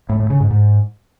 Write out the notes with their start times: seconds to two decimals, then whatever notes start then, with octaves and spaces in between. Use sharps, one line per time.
0.09 A2
0.20 A2
0.30 C#3
0.40 G#2
0.51 G#2